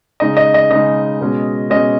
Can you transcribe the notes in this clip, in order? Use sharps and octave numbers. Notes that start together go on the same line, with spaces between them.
C#3 G#3 D#4 D#5
D#5
D#5
C#3 G#3 D#4 D#5
B2 G#3 C#4
B2 G#3 C#4 D#5